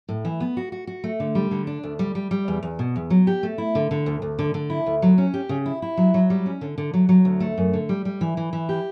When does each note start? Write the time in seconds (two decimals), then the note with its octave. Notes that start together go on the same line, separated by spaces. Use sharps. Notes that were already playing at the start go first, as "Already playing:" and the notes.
0.09 A2
0.25 E3
0.40 B3
0.57 F#4
0.72 F#4
0.87 F#4
1.04 A3
1.20 D3
1.35 G3
1.51 D3
1.67 D4
1.83 D2
1.99 G3
2.15 G3
2.31 G3
2.48 E2
2.63 E2
2.79 B2
2.96 E2
3.10 F#3
3.27 G4
3.43 A3
3.58 E4
3.75 D3
3.91 D3
4.06 D2
4.22 D2
4.39 D3
4.54 D3
4.70 E4
4.86 D2
5.02 F#3
5.18 C#4
5.34 G4
5.49 C#3
5.66 E4
5.82 E4
5.97 F#3
6.14 F#3
6.30 G3
6.46 C#4
6.61 D3
6.78 D3
6.94 F#3
7.09 F#3
7.25 D2
7.40 A3
7.57 F#2
7.73 D3
7.89 G3
8.05 G3
8.21 E3
8.37 E3
8.53 E3
8.69 G4